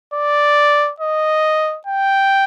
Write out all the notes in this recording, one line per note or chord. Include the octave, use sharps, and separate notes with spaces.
D5
D#5
G5